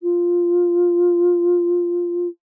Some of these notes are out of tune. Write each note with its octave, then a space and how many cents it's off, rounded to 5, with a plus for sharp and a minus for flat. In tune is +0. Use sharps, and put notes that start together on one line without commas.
F4 +0